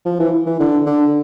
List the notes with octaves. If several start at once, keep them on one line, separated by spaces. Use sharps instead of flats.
F3
E3
E3
D3
D3